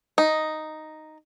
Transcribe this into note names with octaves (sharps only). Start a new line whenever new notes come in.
D#4